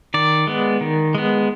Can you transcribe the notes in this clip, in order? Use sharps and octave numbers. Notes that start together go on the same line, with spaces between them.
D#3 D5
G#3 B3
D#3
G#3 B3